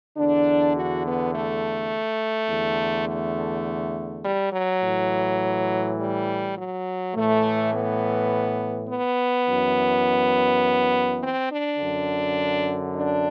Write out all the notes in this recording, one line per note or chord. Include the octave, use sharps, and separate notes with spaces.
E2 D3 D4
F#4
B3
A3
E2 D3
A3
G3
F#3
A2 E3
G3
F#3
A2 E3 A3
B3
B3
F#2 E3
C4
D4
F#2 D3
D4